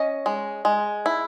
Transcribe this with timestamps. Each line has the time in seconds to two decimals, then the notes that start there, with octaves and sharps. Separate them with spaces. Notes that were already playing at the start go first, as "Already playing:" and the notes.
Already playing: C#4 D#5
0.26 G#3
0.65 G#3
1.06 E4